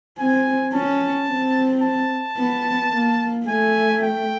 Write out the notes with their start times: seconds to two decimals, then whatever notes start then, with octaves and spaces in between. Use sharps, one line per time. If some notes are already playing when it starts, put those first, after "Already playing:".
0.18 C4 G#5
0.73 C#4 A5
1.28 C4
1.82 A5
2.37 B3
2.92 A#3
3.47 A3 G#5
4.02 G5